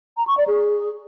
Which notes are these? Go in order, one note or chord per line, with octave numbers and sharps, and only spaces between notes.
A#5
C#6
D5
G#4